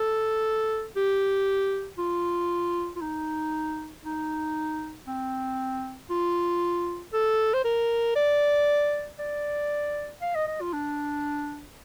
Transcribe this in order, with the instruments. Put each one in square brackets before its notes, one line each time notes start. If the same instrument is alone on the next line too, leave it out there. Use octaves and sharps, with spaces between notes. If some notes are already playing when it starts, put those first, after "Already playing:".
Already playing: [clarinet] A4
G4
F4
F4
D#4
D#4
C4
F4
A4
C5
A#4
D5
D5
F5
D#5
D#5
F4
D4